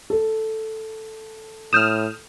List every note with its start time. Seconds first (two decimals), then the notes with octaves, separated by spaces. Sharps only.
0.10 A4
1.73 A2 D#6 F6 G6 E7